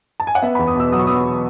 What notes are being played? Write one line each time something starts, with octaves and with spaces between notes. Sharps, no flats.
A5
G#5
F#5
B3 E5
E2 B5
D#6
B2 E6
F#3 D#6
C#6
B3 D#6